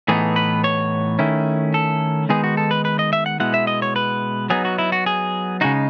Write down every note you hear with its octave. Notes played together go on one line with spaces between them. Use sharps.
A2 E3 B3 D#4 G#4
B4
C#5
D#3 A3 C#4 E4
A4
D#3 G#3 B3 D#4 G#4
F#4
A4
B4
B4
D#5
E5
F#5
B2 G#3 B3 E4 F#5
E5
D#5
C#5
B4
F#3 B3 D#4 G#4
F#4
E4
F#4
G#4
C#3 G#3 D#4 F#4